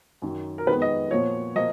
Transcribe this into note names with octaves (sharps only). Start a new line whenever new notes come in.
F#2 D#3 F#3
A#4
F2 D#3 G#3 B3 B4
D#5
A#2 F3 B3 C#5
F3 A#3 D#5